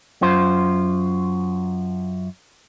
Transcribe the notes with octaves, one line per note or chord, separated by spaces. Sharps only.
F#2 F4 C5